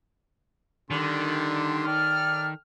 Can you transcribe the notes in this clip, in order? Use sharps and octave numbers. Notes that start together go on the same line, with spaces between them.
D3 D#3 G3 C6
A4 D5 G5 F6